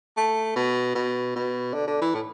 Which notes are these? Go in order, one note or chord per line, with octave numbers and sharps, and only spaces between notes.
A3
B2
B2
B2
D3
D3
E3
A2